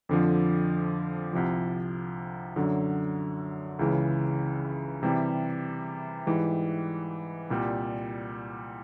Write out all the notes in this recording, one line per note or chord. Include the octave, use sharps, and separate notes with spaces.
F2 D3 F3
C2 C3 F3
F#2 D3 F#3
C#2 C#3 E3
C3 E3 G3
G#2 E3 G3
C2 A#2 G3